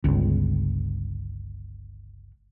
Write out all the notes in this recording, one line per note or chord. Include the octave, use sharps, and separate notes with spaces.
G1 C#2